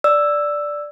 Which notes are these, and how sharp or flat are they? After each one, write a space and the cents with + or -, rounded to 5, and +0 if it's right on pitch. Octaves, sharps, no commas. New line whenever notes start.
D5 +0 E6 +5